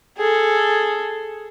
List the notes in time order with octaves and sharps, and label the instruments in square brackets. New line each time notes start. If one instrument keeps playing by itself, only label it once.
[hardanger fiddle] G#4 A4